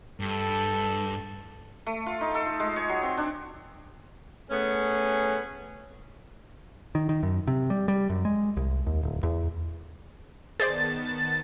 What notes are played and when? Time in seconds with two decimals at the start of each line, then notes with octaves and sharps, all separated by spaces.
0.20 G2 A4
1.86 A3
2.06 F4
2.21 D#4
2.35 A4
2.46 F4
2.60 G#3
2.76 C#5
2.89 F#3
3.03 C4
3.17 D4
4.49 A3 B3 C#4 G#4
6.95 D#3
7.09 D#3
7.23 F#2
7.47 C3
7.70 G3
7.88 G3
8.10 F#2
8.25 G#3
8.57 C2
8.86 D#2
9.03 D1
9.23 E2
10.60 D#3 B3 G#4 C5 D5 A5 A6
11.05 A6